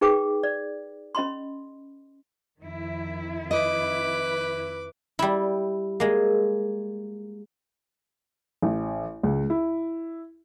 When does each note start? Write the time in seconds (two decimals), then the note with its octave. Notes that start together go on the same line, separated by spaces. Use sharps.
0.01 D#4 G#4 B4 G5 D6
0.43 D5
1.15 C#4 D#5 B5 C6
2.60 F2 D#3 E4
3.51 B4 D#5 D6
5.19 G3 E4
6.00 G#3 A#3
8.62 A1
9.23 C#2
9.50 E4